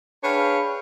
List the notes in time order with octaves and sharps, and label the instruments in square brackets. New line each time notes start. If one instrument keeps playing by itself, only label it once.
[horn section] D4 G#4 B4 C#5 F5 G5